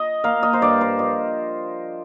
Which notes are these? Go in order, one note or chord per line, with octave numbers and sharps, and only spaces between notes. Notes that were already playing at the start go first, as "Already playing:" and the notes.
Already playing: D#5
A#3 F5
D#5
C5
G2 D5
C5
F3 D#5